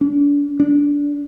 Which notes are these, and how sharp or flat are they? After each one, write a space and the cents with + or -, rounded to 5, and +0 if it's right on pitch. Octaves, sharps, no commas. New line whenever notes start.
D4 -35
D4 -20